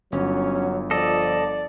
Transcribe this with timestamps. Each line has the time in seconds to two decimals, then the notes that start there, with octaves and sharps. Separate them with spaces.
0.12 G1 F#3 C#4
0.91 F3 A4 D5 D#5